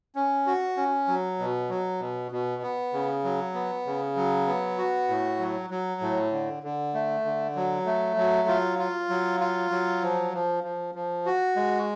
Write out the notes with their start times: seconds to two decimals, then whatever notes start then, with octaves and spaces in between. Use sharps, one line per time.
0.15 C#4
0.46 F#4
0.77 C#4
1.08 F#3
1.39 B2
1.69 F#3
2.00 B2
2.32 B2
2.62 B3
2.93 C#3
3.24 F#3
3.54 B3
3.86 C#3
4.16 F#3
4.47 B3
4.78 F#4
5.08 A2
5.39 F#3
5.70 F#3
6.01 A2
6.32 D3
6.63 D3
6.94 A3
7.25 D3
7.55 F#3
7.86 A3
8.17 F#3
8.48 F4
8.79 F4
9.09 F#3
9.41 F4
9.71 F#3
10.02 F3
10.33 F3
10.64 F3
10.95 F3
11.26 F#4
11.56 G#3